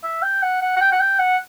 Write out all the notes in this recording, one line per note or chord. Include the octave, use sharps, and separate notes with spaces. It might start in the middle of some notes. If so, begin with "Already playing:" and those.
E5
G5
F#5
F#5
F#5
G5
F#5
G5
F#5